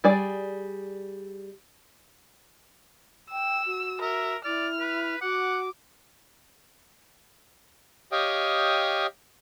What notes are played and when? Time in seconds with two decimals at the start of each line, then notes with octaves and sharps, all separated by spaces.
0.04 G3 G#4 D5
3.31 G5 E6
3.65 F#4
4.01 A#4 E5
4.45 E4 D5 F6
4.80 B4
5.21 F#4 F#5 D6
8.12 G4 C#5 D#5 F5 G5 D#6